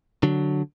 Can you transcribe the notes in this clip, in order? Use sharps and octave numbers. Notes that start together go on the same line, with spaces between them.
D3 F#3